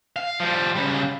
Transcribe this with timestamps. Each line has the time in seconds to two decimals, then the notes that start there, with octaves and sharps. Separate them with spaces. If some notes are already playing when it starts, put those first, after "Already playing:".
0.16 F5
0.40 F3 G3
0.75 C#3 G3